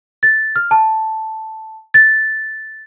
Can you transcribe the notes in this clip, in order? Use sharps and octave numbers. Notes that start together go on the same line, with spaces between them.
A6
F6
A5
A6